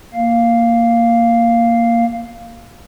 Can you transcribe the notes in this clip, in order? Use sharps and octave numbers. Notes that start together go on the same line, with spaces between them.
A#3 F5